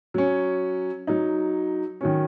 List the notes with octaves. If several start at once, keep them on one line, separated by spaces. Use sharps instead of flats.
F#3 C#4
F#3 D#4
D#3 F#3 C#4